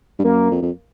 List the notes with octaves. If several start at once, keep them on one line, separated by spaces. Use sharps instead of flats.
G2
F#2 A#3
F2
F2